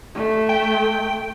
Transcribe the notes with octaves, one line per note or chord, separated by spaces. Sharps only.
A3
G5